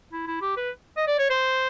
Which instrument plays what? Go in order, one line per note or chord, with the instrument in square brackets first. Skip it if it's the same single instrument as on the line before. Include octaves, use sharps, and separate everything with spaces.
[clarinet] E4
E4
G4
B4
D#5
D5
C#5
C5